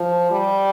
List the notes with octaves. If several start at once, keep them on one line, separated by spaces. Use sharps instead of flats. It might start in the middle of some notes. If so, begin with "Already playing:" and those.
Already playing: F3
G3